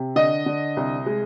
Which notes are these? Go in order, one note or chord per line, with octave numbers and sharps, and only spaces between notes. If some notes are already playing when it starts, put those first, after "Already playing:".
Already playing: C3
D3 D#5
D3
C2
G#3